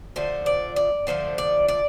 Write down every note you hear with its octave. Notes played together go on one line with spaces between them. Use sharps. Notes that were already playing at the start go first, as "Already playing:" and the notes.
D3 F3 A3 C5
D5
D5
D3 F3 A3 C5
D5
D5